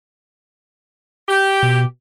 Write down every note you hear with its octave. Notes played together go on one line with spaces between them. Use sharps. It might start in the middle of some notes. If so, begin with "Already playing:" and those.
G4
B2